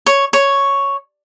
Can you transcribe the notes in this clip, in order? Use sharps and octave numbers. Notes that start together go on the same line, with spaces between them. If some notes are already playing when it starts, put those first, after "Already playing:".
C#5
C#5